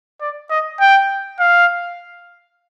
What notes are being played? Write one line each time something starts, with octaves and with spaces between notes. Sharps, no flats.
D5
D#5
G5
F5